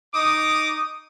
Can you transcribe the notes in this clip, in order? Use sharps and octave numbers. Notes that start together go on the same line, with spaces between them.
D#4 D6 D#6